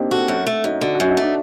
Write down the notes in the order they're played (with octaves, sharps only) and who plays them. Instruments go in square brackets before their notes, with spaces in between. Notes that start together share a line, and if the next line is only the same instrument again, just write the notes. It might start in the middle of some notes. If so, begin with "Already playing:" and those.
Already playing: [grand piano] A#3 C4 D4 D#4 G4
[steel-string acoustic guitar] F#4 [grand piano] A4
[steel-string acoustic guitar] F#2 [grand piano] A4
[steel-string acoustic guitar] A3
[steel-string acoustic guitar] F#2 [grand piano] D#4
[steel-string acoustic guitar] D3 [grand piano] F#4
[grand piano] F#4
[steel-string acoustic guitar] F#2
[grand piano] D#4
[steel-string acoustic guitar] A3 [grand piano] D4